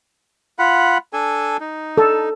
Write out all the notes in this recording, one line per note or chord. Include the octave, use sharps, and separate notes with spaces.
F4 F#5 B5
D4 A4 G#5
D#4
A4